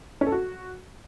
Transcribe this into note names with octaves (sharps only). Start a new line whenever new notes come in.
C#4
A4
F#4